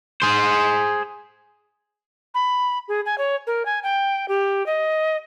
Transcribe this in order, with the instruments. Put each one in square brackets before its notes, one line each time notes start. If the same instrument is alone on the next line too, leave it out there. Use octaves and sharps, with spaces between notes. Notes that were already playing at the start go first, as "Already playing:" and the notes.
[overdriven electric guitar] G#4 C5
[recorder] B5
G#4
G#5
C#5
A#4
G#5
G5
G4
D#5